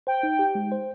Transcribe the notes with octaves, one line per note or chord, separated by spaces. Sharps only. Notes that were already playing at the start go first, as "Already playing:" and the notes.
C5 G5
D#4
G4
G#3
C5